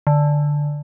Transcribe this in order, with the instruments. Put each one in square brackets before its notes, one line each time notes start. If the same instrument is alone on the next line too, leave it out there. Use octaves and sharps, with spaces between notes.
[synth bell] D3